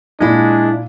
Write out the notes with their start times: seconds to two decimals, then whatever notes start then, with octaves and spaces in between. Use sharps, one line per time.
0.21 A#2 G#3 D4 E4 F4